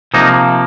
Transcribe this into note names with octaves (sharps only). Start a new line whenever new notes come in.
C3 F3 A#3 D#4